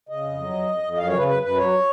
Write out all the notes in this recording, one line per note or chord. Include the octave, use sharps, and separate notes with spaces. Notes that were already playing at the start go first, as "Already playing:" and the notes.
C#3 D#5
F2
F#3
F2
F2
F2
D#5
F#2 F5
C#5
C#3 B4
F#2 B4
F#2 B4
F#3 C#5